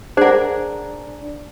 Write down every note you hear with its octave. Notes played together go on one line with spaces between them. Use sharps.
D4 G#4 A#4 C5 D5 F#5